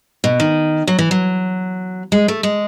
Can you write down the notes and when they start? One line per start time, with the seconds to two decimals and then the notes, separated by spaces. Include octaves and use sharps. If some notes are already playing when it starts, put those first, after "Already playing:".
0.24 B2
0.40 D#3
0.87 F#3
0.99 E3
1.11 F#3
2.12 G#3
2.28 A3
2.43 G#3